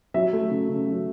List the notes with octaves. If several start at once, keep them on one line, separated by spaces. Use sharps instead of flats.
F#3 E5
A3
C#3
C#3
F#3